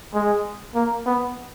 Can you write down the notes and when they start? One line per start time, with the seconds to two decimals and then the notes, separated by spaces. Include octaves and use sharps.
0.14 G#3
0.75 A#3
1.06 B3